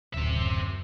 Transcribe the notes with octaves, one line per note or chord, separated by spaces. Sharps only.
D1 F#2 C4 E5